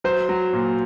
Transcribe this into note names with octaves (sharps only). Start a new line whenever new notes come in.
F#3 C5
F#3
A#2